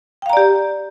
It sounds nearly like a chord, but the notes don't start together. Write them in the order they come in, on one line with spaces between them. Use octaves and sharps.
G5 F5 A#5 D5 G4